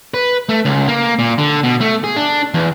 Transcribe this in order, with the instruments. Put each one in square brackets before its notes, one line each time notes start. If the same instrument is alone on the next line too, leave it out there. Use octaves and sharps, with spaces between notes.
[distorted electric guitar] B4
A3
C#2
A#3
A#2
D3
B2
A3
G#4
D4
E2